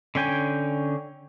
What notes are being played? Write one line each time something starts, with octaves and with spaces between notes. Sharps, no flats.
D3 C#4 G5 G#5